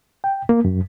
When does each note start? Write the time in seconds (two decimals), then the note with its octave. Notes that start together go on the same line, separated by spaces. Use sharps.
0.24 G5
0.49 A#3
0.65 F#2